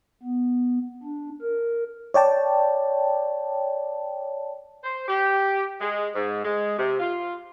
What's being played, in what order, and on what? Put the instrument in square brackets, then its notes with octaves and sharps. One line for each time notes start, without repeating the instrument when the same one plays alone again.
[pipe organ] B3
D4
A#4
[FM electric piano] C#5 D5 G5 A5
[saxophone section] C5
G4
G#3
G#2
G#3
C3
F4